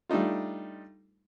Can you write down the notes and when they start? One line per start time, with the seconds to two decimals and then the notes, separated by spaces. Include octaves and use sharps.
0.09 G3 A3 D4 D#4 F4